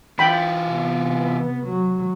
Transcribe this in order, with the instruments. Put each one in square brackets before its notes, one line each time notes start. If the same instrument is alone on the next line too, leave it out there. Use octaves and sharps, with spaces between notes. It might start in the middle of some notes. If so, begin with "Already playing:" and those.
[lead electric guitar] E3 F4 [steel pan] G5 B5
[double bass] C3 B3
F#3